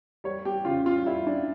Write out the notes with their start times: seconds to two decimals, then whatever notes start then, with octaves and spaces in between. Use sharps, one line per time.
0.24 G3 C#5
0.45 G4
0.65 C#3 F4
0.86 F4
1.05 G3 E4
1.27 D4